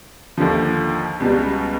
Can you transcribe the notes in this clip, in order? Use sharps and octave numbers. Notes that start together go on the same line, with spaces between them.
D#2 D3 F3
C#2 B2 G3